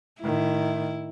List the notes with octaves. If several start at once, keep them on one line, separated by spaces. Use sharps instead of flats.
A2 D#3 E4